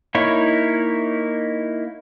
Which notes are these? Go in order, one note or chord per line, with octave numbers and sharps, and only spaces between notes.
A#3 D#4 E4 C#5